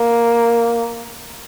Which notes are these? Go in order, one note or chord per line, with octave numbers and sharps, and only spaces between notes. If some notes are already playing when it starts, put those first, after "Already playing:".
Already playing: A#3